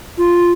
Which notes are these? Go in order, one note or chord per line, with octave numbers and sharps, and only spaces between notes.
F4